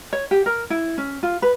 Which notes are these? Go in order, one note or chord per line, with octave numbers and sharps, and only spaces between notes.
C#5
G4
A#4
E4
C#4
F4
B4